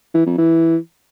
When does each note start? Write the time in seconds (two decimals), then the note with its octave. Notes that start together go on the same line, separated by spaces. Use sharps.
0.14 E3
0.26 F2
0.38 E3